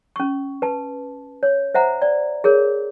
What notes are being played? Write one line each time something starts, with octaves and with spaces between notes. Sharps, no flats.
C#4 C#6
B4 A5
C#5
C5 E5 F#5 A#5
D5
G#4 A#4 C#5